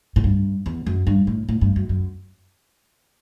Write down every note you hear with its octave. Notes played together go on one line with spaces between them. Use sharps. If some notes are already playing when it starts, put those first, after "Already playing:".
A2
G2
E2
F#2
G2
A2
A2
G2
F#2
F#2